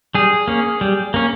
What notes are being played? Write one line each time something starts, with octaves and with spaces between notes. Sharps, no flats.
G3 G#4
A#3 C#4
G3
A#3 C#4